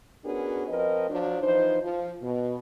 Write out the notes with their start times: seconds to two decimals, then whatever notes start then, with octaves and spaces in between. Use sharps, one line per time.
0.24 B3 C#4 D4 F#4 G#4 A#4
0.68 F3 C4 A#4 B4 D#5
1.09 F3 F#3 D4
1.42 E3 F3 D#4 C5
1.83 F3
2.22 B2